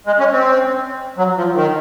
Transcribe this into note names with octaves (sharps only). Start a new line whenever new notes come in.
G#3
C#4
C4
F#3
F3
D#3